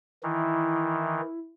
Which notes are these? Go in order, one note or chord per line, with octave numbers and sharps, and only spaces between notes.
D#3 E3 E4